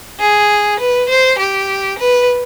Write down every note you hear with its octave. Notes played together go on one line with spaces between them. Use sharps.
G#4
B4
C5
G4
B4